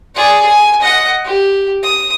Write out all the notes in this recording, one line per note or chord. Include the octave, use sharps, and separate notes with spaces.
G#4 D5
G#5
D#5 F#5
G4
D#6